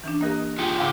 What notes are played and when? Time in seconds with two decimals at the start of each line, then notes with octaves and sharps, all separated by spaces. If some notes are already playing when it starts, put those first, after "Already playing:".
0.04 E3 C#4 D4
0.21 A#3 G4 A#4 D#5 F#6
0.58 F4 G4 G#4 C#7
0.78 G#2 C#3 F5 F#5 D6